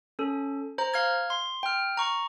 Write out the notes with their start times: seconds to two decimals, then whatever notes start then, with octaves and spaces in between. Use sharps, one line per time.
0.19 C#4 A4
0.78 C5 A#5
0.94 F5 F6 G#6
1.30 C6
1.63 G5 F6
1.97 A#5 C#6